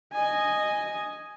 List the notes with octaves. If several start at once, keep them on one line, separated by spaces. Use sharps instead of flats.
D#5 G#5